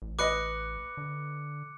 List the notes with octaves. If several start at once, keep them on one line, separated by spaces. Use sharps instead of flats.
A1
B4 D#5 D6 F#6 C#7
D3